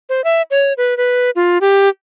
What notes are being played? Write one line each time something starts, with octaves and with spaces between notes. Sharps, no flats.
C5
E5
C#5
B4
B4
F4
G4